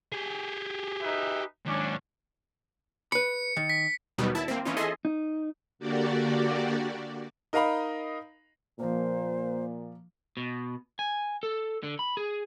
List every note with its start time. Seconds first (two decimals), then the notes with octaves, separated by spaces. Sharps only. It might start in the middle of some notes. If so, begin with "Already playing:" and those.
0.12 G4 G#4
1.01 D#4 B4 E5
1.66 D#2 G#2 C#4 D4
3.12 B4 B5 C#7
3.57 D#3
3.70 B6
4.18 D#2 B2 D#3 F#3 G3 B3
4.35 E4 E5 A5
4.48 A#3 C4
4.65 E3 C#4 D#4 F4
4.77 G#4 A4 D#5 E5 G#5 C6
5.05 D#4
5.79 D3 A#3 F#4 G4 D5
7.53 D#4 A#4 D#5 F5 A#5 B5
8.80 A#2 F3 A#3 C5
10.37 B2
10.99 G#5
11.43 A4
11.83 D3
11.99 B5
12.17 G#4